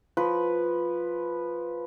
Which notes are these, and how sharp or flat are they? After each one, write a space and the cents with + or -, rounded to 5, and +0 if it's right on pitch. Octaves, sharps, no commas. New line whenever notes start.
F3 +5 B4 +0